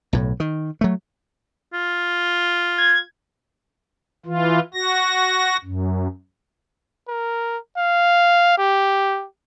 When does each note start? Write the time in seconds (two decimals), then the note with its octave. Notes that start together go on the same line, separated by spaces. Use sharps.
0.13 B1 A2
0.40 D#3
0.81 F#3 A3
1.73 F4
2.78 G#6
4.26 E3 F4
4.74 F#4 A#6
5.65 F#2
7.08 A#4
7.78 F5
8.58 G4